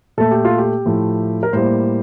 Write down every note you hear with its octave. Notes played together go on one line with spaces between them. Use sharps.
A#2 A3 A4
G4
F4
G4
A2 F3 A3
A#4
A2 G3 A#3 C5